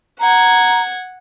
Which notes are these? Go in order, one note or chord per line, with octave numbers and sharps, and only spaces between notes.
F#5 A#5 G#6